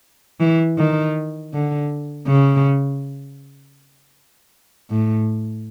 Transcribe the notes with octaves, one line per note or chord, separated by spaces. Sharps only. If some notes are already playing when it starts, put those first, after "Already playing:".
E3
D#3
D3
C#3
A2